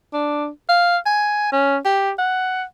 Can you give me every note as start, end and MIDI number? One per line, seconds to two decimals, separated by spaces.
0.13 0.48 62
0.69 0.97 77
1.06 1.51 80
1.52 1.77 61
1.85 2.12 67
2.18 2.63 78